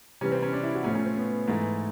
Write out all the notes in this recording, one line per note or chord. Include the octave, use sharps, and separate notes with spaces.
C3 E3 G3 C#4
C4
C#4
D4
E4
F#4
A2 F3 A3 C#4
C#4
C4
B3
G#2 E3 A3